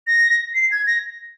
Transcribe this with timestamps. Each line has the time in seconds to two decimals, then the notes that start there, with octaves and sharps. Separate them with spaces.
0.07 A#6
0.55 C7
0.71 G#6
0.87 A#6